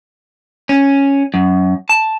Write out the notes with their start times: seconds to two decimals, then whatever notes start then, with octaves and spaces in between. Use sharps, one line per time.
0.69 C#4
1.34 F#2
1.89 A5